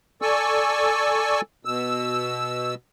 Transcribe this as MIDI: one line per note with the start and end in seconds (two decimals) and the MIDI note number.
0.22 1.41 69
0.22 1.41 74
0.22 1.41 80
0.22 1.41 85
0.22 1.41 88
1.65 2.74 47
1.65 2.74 88